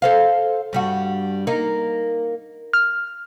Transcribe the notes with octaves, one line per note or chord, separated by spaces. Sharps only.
A4 C5 F5
G2 G3 F#4
A#3 D#4
F6